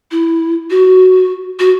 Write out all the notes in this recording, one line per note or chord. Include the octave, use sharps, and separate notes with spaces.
E4
F#4
F#4